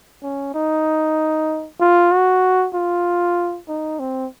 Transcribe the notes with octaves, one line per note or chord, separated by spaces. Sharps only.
C#4
D#4
F4
F#4
F4
D#4
C4